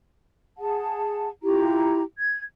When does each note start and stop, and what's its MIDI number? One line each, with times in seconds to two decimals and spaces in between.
0.58 1.28 68
0.58 1.28 78
0.58 1.28 81
1.43 2.00 64
1.43 2.00 65
1.43 2.00 67
1.43 2.00 82
2.17 2.42 92